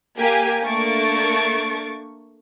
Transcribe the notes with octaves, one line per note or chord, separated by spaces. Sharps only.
A#3 G4 G#5
A3 A#3 D4 C#6 A6 D7